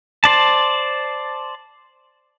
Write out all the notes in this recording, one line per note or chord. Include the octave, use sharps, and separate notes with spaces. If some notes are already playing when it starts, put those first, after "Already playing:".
C5 D5 A5